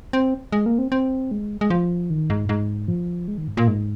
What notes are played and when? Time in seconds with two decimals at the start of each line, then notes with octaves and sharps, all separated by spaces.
0.13 C4
0.52 G#3
0.66 A#3
0.78 C4
0.92 C4
1.31 G#3
1.61 G#3
1.70 F3
2.10 D#3
2.30 G#2
2.49 G#2
2.88 F3
3.28 G#3
3.38 D#3
3.48 G#2
3.57 A#2
3.68 G#2